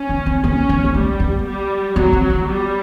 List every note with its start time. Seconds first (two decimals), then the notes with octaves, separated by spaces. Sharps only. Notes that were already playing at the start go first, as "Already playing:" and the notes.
Already playing: C#4
0.09 B3
0.26 C4
0.44 B3 C#4
0.69 B3
0.84 A#3
0.94 G3 A3
1.20 B3
1.45 G3
1.95 F#3 B3
2.13 C4
2.30 B3
2.47 G3